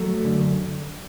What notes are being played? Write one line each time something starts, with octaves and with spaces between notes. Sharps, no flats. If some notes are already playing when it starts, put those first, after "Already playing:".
Already playing: F#3 A3
F#2 D3